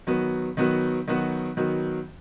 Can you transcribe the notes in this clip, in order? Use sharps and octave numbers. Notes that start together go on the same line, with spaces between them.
D#3 F#3 B3 F#4
D#3 F#3 B3 F#4
D#3 F#3 B3 F#4
D#3 F#3 B3 F#4